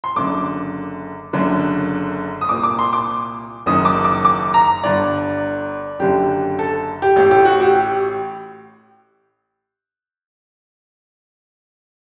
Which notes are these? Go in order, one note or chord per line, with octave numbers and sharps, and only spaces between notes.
C6
F#1 F#2 D3 D6
F#1 F#2 D3
D#6
C2 A#2 D6
D6
C6
D6
F#1 F#2 D#3 D#6
D6
D6
D6
A#5
G1 G2 D3 D5
F#1 F#2 D3 G4
A4
G4
A1 A2 G4
G4
F#4
G4
G4